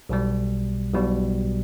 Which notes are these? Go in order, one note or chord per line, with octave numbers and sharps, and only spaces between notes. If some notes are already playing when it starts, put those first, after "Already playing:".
B1 B2 G3
B1 B2 G3